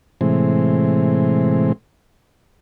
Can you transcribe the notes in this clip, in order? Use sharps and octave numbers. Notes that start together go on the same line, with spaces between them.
A2 C3 E3 G#3 C4